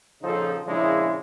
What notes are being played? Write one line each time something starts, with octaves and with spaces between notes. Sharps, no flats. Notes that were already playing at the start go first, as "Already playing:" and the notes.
A#1 C#3 F3 D#4 A4 C5
A#2 C#3 F3 G#3 D4 E4